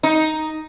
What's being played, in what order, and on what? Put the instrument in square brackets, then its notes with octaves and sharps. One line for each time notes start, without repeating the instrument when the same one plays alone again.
[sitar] D#4